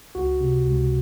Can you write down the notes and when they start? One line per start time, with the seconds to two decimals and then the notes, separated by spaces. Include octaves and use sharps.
0.15 C#2 F#4
0.41 C3
0.66 C#2